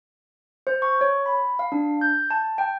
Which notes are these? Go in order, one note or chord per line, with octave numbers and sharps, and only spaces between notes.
C5
C#6
C#5
B5
F5
D4
G6
A5
G5